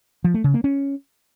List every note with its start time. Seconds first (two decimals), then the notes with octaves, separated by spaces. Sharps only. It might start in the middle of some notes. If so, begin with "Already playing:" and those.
0.24 F3
0.34 A3
0.44 C#3
0.54 A#3
0.64 C#4